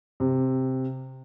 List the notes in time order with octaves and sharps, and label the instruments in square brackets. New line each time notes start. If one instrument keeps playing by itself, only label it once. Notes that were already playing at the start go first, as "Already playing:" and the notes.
[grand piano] C3